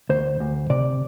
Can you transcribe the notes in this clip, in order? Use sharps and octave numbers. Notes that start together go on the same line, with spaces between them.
D2 C5
D2
C3 D5